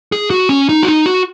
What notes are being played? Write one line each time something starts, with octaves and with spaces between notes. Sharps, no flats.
G#4
F#4
C#4
D#4
F#4
D#4
F#4